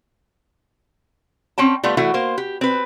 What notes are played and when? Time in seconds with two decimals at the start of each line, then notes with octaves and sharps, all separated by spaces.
1.58 C4 C#4 G5 A5
1.84 G3 A3 B3 F4
1.97 E3 A3 E4 F#4
2.14 A#3 C5
2.38 G4
2.61 C4 B4